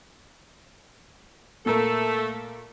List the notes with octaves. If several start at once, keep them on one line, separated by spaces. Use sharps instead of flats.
A#2 A3 A4 A#4